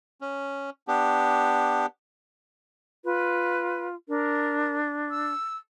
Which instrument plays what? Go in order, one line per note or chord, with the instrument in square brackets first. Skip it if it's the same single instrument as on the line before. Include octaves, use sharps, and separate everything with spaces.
[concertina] C#4
B3 D4 G4
[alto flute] F4 [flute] B4
[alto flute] D4 [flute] A#4
[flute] E6